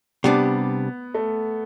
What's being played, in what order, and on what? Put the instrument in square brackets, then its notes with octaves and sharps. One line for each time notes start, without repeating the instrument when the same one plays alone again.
[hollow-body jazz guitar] C3 G3 D4 [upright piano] B3
[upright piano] A3